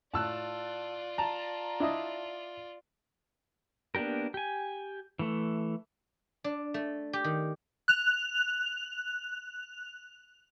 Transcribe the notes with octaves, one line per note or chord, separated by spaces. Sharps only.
A2 F4 D5 A5 E6 F#6
A5 A#5
D4 E4 D#5
A#3 B3 D4 G4 A#4
G4 G#5
E3 A3
D4
A3
G4
D#3
F#6 F7